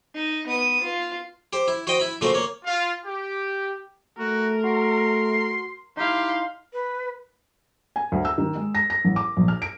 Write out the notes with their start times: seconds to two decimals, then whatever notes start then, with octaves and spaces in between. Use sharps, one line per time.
0.15 D#4
0.47 B3 D#6
0.82 F4
1.53 G4 C5
1.68 E4
1.87 F#4 C5 D#5 G5
2.00 E4 B5
2.21 A#2 C#3 A3 F#4 C5
2.34 A#3 C#5
2.65 F4
3.05 G4
4.18 A3 F#4 A#4
4.64 F#4 C6
5.97 D#4 E4 G4 F5 C6
6.73 B4
7.96 G#5
8.12 D2
8.25 E6
8.38 D#3
8.55 G#3
8.75 A#6
8.90 A#6
9.05 A1
9.16 D6
9.37 A#1
9.48 F6
9.62 D7